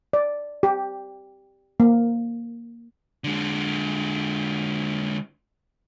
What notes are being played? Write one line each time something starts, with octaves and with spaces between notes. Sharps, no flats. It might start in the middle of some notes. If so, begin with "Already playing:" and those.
D5
G4
A#3
D3 G#3